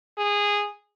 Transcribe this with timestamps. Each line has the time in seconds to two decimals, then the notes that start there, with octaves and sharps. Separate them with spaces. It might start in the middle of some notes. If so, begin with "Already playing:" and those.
0.18 G#4